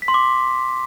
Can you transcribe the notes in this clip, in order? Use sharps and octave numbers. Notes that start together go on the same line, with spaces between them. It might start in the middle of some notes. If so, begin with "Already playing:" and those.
B6
C6
D6